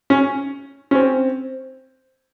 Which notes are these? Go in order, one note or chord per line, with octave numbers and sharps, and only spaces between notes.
C#4
C#4
C4